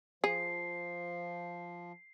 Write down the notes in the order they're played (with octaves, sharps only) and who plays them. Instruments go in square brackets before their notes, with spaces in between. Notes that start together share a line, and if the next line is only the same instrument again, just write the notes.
[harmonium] F3 [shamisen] G#4 [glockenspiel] C7